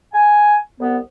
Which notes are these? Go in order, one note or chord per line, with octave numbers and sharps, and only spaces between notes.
G#5
C2 B3